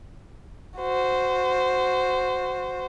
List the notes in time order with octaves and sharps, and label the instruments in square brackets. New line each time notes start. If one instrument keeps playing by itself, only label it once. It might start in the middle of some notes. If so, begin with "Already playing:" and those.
[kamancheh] F#4 C5